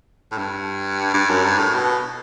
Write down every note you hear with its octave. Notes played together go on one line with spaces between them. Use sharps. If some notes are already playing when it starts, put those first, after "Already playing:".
A2
G2
G2
F#2
G2
A2
B2